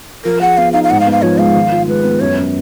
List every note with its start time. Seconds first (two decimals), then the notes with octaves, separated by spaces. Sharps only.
0.24 F3 A#4
0.41 G#4 F#5
0.57 B3 F5
0.73 D#4 F5
0.84 F5
0.90 G#2 F#5
1.00 F5
1.07 B3
1.12 F5
1.22 F3 C#5
1.38 G#3 F5
1.55 D#3
1.72 F4
1.87 G#3 B4
2.04 B3
2.20 F#2 C#5
2.37 C#4